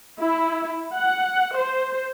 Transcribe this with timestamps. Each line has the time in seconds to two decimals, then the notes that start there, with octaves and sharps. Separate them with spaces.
0.20 E4
0.94 F#5
1.55 C5